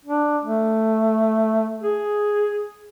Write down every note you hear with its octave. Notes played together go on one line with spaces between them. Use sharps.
D4
A3
G#4